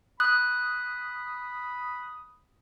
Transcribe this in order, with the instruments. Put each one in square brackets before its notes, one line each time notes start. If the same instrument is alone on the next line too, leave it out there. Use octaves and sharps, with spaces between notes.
[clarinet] B5 [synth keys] D#6 [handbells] F#6